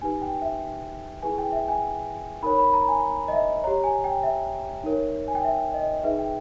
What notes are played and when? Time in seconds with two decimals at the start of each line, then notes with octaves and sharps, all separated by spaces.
0.02 D#4 G4 B4 G#5
0.22 G5
0.42 E5
1.22 E4 G#4 B4 G#5
1.38 G5
1.52 E5
1.68 G#5
2.42 D#4 A#4 C#5 B5
2.58 B5
2.74 A#5
2.88 G#5
3.28 D#5
3.33 E5
3.64 G4 C#5 A#5
3.84 G#5
4.04 G5
4.23 E5
4.84 D#4 A#4 C#5
5.28 G#5
5.35 G5
5.44 E5
5.74 D#5
6.04 D#4 G#4 B4 E5
6.19 G5